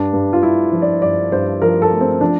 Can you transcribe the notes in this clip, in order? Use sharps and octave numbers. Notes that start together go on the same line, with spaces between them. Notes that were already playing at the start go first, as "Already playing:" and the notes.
Already playing: G2 D4
G2
F4
G2 E4
F3
D5
G2 D5
G2 C5
F3 A#4
A4
A3
C4
F3 D4